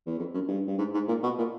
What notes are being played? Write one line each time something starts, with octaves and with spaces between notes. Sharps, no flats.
E2
F2
F#2
G2
G2
G#2
G#2
A#2
B2
A#2